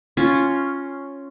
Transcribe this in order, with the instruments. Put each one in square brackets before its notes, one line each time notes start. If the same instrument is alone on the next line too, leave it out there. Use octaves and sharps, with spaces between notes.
[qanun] C#4 F4